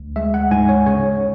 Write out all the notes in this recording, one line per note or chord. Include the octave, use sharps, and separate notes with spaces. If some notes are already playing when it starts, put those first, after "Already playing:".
Already playing: D2
G#3 E5
F#5
G#2 G#5
C#5
C#3 C#5